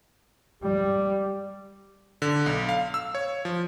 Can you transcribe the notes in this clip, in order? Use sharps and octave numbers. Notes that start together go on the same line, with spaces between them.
G3 G4
D3
B1
F5
E6
C#5
F3